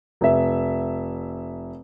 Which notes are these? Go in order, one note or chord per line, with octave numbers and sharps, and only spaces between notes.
F1 E5